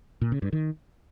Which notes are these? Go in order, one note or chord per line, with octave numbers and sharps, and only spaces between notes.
A#2
C#3
G2
D#3